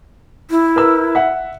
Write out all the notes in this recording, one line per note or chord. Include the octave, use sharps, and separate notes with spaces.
E4
A#4 B4 E6
E5 F#5